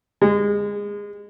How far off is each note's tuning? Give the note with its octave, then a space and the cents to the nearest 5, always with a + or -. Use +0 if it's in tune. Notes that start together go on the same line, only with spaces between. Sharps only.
G#3 -25